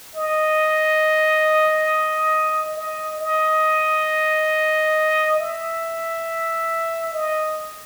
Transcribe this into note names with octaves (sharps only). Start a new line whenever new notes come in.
D#5
D#5
D#5
E5
D#5